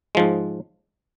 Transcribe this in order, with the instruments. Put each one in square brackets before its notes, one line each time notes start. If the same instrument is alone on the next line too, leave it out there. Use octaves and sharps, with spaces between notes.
[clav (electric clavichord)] G#2 F3 G#3